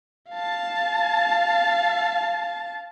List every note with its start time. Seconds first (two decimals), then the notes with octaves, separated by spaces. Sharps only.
0.31 F5 A5